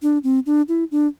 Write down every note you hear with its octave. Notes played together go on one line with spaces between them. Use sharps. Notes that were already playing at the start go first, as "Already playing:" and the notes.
D4
C4
D4
E4
D4